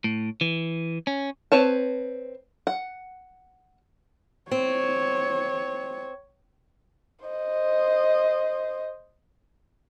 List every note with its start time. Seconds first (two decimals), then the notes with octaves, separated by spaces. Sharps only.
0.04 A2
0.41 E3
1.07 C#4
1.52 C4 B4 C#5 A5
2.67 F#5
4.51 C4 C#5
7.25 C5 D#5